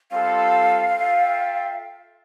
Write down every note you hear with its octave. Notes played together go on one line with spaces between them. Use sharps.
G3 C4 F4 A4 F5
F4 A4 E5 G5